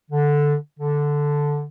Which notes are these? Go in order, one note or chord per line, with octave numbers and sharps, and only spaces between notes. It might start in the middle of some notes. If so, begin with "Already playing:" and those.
D3
D3